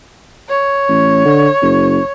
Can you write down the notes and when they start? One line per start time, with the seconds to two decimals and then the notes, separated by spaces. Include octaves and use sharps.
0.49 C#5
0.89 A1
1.25 D3
1.62 F#1